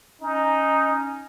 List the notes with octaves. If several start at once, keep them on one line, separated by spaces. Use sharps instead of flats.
C#4 D#4